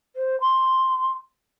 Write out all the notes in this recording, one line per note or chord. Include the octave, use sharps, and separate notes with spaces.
C5
C6